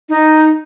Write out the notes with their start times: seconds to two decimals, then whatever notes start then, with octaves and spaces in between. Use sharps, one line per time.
0.09 D#4